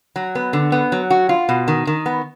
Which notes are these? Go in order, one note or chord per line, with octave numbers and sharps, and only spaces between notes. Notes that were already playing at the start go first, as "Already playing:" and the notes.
F#3
B3
D3
B3
F#3
F#4
F4
B2
D#3
D#3
B3